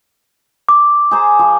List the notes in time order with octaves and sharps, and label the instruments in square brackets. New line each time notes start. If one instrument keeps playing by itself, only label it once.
[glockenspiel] D6
[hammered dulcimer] G#4 C5 A#5
F3